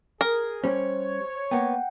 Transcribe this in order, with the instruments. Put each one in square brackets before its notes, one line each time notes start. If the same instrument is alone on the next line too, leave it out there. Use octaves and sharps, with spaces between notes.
[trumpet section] G#4 [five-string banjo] A#4
[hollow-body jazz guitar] G3 C#4 [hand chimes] C5 [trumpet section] C#5
[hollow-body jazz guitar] A#3 B3 [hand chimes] F#5 G5